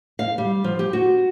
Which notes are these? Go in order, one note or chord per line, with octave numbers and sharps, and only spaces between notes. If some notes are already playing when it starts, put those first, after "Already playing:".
F5
G3
F3
G4
F#4